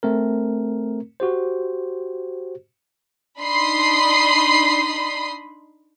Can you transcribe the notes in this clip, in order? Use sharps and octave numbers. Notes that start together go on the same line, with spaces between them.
A3 C4 A#4
F#4 G4 C5
D4 D#4 B5 C6 D#6 C7